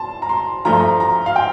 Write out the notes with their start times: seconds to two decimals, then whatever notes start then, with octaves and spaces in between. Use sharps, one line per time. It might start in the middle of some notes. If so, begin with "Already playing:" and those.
Already playing: A5 C6
0.22 A#5
0.29 C6
0.65 G2 F3 A3 A#5
0.72 C6
0.80 A#5
1.00 A#5
1.26 F5
1.36 G5